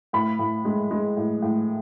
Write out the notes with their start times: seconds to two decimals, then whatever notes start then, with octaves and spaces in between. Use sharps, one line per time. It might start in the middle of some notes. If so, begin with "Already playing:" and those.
0.13 A2 B5
0.39 A2
0.65 G#3
0.91 G#3
1.17 A2
1.42 A2